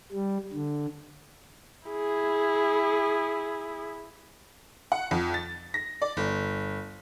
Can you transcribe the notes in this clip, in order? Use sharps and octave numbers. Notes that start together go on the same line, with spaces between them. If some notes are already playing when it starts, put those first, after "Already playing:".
G3
D3
E4 G#4
F#5
F2
A6
A#6
D5
G1